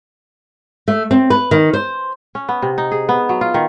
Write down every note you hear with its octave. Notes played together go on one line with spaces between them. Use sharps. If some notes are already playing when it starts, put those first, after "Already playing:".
A3
C4
B4
D#3
C5
C#4
B3
C3
D#4
G#4
B3
F#3
F4
D#3